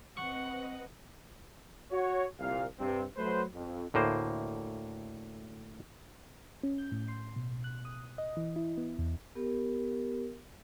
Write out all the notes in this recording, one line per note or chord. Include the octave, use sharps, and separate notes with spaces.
C4 B4 D#5 F#5 C#6
F#4 C#5
C2 A#2 F5
G2 C3 C4
F#3 A3 B4 C5
F2
D2 A2 A#3 C5
C#4
G6
A2
C6
B2
F#6
D#6
D#5
E3
E4
B3
E2
B3 G4 A#4